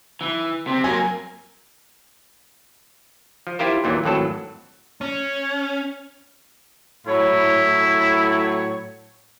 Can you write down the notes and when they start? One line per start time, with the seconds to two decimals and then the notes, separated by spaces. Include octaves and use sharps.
0.21 E3
0.67 C3
0.84 F#3 A#3 G#5
3.47 F3
3.59 E4 F4 G4 A#4 C5
3.84 D#2 A#2 E3 F#3
4.04 G#1 F2 A2 F#3 A4
5.01 C#4
7.07 A2 F#3 E4 C#5